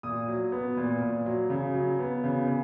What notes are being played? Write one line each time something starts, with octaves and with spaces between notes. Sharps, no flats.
A#2 D#6
F#3
B3
A#2
A#2
F#3
C#3
F#3
B3
C#3
C#3